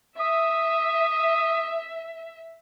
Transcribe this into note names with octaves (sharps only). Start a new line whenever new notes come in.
E5 D#6